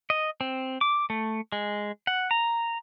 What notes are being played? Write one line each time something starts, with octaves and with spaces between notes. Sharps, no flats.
D#5
C4
D6
A3
G#3
F#5
A#5